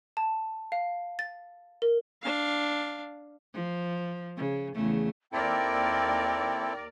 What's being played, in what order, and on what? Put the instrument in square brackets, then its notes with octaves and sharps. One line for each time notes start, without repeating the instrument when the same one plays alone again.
[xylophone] A5
F5
A6
A#4
[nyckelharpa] D4 F5
[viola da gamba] F3
C#3
E2 C#3 A3
[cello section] D#2 A#4 D5 [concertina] C4 E4 A4 [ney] G5